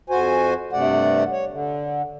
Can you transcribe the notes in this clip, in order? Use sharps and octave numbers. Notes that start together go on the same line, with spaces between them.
F2 F#4 C5 G#5
G2 C3 A3 D5 F#5
C#5
D3